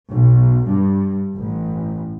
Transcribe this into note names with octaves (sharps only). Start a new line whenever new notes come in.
B1
G2
A1